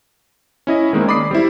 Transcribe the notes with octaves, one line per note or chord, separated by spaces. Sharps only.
C#4 E4 D#5
D#3 G#3 A#3 C4
D5 B5 D6 D#6 C7
G3 C4 E4